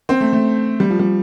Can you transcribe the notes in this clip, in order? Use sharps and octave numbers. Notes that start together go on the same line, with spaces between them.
C4
A3
A3
G3
F3
G3